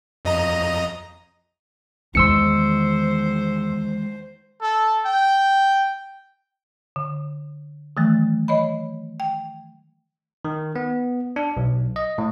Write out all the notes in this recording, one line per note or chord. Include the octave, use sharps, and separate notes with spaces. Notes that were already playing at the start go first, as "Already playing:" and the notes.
F2 D#5 A#5
E2 D#3 G#3 C5 C6 E6 C#7
A4
G5
D3
D#3 E3 F#3 A3
C#5 D#5 B5
G5
D#3
B3
D4
B1
D#5
A2